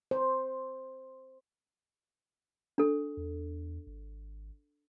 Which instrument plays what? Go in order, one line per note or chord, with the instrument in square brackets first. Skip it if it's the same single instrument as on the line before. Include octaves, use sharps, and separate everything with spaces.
[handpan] C5
[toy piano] D4 A4
[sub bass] E2
G#1